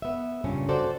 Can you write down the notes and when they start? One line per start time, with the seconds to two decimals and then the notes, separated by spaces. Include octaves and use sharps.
0.02 B3 E5
0.44 G2 A#2 C#3 C#4
0.69 F#4 A4 C5 D5